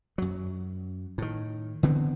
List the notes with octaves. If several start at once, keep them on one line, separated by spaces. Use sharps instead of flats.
F#2 F#3
A2 D#3
D3 E3 B3 C4